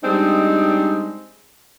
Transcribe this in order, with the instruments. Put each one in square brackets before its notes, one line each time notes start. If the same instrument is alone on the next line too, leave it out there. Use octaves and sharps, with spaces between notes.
[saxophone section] G3 G#3 C4 D4 D#4